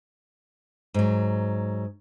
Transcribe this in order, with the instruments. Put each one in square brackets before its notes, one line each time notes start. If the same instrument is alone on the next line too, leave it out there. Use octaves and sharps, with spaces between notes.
[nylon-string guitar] G#2 F#3